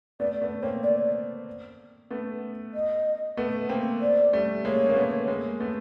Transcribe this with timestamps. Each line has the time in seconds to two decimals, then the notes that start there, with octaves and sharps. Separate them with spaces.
0.20 A3 B3 D5
0.41 A3 B3
0.62 A#3 C4 C#5
0.83 D5
1.05 D5
2.10 A3 B3
2.74 D#5
3.37 A3 B3
3.69 A#3 C4
4.01 D5
4.33 G3 A3
4.64 G#3 A#3 C#5
4.89 A#3
4.96 A3 B3
5.28 G#3 A#3
5.60 A3 B3